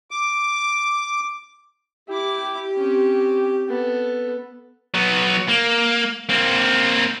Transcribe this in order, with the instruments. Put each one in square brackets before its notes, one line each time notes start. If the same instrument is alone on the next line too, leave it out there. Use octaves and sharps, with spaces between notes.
[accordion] D6
[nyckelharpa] E4 D6 [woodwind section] G4
[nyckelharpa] C4 C#4
B3 A4
[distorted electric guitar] F#3 B3
A#3
A#3 C4